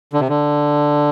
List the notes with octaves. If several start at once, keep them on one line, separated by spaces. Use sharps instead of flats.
D3
C3
D3